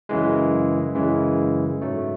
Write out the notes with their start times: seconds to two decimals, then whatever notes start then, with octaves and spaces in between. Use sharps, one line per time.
0.09 F#2 C#3 E3 G#3
0.95 F#2 C#3 E3 G#3
1.82 G#2 F#3 A3